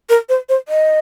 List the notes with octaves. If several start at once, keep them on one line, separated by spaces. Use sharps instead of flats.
A#4
C5
C5
D#5